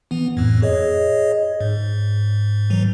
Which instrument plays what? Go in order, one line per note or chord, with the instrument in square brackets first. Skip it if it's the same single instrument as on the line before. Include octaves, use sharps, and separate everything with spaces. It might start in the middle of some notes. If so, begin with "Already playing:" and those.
[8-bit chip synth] E3 B3
F2 A2
G#4 C#5 D#5
G#2
G#2 E3 F#3